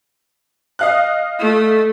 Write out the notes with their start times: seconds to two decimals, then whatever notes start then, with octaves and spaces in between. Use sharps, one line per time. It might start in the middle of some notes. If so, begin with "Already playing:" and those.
0.79 D#5 F5 F#6
1.39 A3